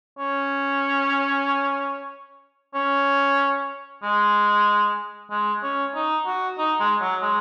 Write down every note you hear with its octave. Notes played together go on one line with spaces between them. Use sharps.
C#4
C#4
G#3
G#3
C#4
D#4
F#4
D#4
G#3
F#3
G#3